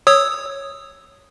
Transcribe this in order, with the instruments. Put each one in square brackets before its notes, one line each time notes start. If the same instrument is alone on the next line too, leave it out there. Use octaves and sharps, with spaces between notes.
[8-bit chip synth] C#5 D#6 E6